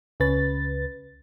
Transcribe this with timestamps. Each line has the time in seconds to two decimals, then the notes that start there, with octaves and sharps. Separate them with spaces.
0.20 C#2 C#3 B4 A6